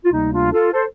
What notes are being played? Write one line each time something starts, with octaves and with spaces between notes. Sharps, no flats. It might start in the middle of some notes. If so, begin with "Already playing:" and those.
F4
D2 C3 G3 A#3 D#4
D4 F4
F4 A4
A4 C5